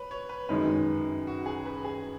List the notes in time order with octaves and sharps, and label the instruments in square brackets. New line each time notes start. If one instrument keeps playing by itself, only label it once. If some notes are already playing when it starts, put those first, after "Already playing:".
Already playing: [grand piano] B4 C#5
C#5
B4
[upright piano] F#2 D#3 G#3 C#4 [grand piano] B4
[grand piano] F#4
G#4
B4
G#4